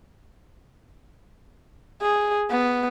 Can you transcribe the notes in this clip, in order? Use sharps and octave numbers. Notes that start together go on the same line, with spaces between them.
G#4
B3